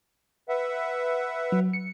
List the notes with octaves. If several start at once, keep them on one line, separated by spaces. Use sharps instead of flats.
B4 E5 F#5
F#3
C#7